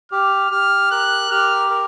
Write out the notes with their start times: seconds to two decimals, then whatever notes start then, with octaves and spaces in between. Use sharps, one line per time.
0.11 G4 F6
0.51 G4 F6
0.91 A#4 F#6
1.31 G4 F6
1.70 A#4